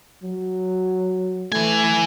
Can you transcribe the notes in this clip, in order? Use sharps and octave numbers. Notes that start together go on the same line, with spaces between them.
F#3
E3 A3 G#5